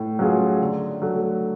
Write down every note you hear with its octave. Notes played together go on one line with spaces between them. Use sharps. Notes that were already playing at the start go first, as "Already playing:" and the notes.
Already playing: A2
F#3 C#4 F4 G#4
D3
F#3 A3